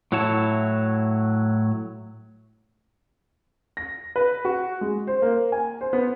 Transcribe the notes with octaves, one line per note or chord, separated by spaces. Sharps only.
A2 F#3 E4 C#5 F#5 A5
A#6
B4
F#4
G#3
C5
A#3
G#5
C5
B3